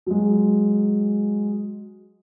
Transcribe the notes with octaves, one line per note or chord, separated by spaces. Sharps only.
F#3 G#3